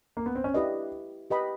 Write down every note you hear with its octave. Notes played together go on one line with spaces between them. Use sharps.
A#3
B3
C4
C#4
D4 E4 G4 B4 D#5
G4 B4 D#5 G5 B5